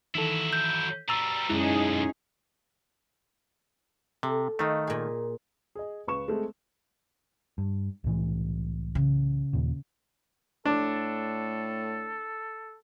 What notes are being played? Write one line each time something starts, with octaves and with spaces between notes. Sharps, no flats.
D#3 E3 F#3 E4 A4
G6
B2 G3 A#5 E6 A6
B1 F#2 D3 G#3 C#4 D#4 E4 G#4
C3 A4
D#3 A3 D#5 F5
A#2 G#4
G#4 D#5
C#2 B4 C#6 E7
G#3 A3 C4
G2
C2 A2 E3
C#3
D#2 A#2
A2 D4 A4